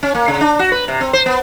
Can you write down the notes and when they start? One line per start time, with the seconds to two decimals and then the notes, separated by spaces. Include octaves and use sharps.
0.03 C#4
0.15 A#3
0.28 C#3
0.41 D4
0.59 F#4
0.72 B4
0.88 C3
1.01 C4
1.13 C5
1.26 B3